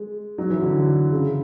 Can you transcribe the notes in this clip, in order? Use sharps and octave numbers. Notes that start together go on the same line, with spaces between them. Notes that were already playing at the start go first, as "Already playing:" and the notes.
Already playing: G#3
F#3
E3
D3
C#3